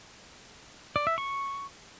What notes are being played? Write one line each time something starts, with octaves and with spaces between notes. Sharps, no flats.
D5
E5
C#6